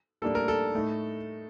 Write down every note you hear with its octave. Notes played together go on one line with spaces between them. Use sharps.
A2 G3 A#3 D4 A4
A#4
A4
A2 A3 D#4